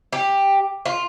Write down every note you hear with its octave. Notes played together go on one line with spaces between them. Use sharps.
G4
F4